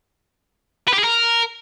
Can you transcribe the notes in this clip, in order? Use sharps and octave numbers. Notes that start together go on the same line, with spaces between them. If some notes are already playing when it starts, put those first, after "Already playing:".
B4
G4
G#4
A#4